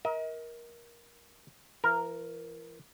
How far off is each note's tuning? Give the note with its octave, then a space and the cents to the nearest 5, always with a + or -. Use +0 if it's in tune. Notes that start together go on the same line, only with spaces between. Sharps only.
A#4 +20 D#5 +40
E3 +35 A#4 +0